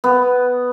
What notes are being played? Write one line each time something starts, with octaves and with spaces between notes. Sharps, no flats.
B3